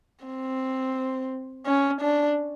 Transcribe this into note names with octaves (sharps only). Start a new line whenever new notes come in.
C4
C#4
D4